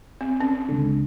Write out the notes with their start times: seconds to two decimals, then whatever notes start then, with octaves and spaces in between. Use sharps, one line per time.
0.21 C4
0.40 C#4
0.69 C#2 D3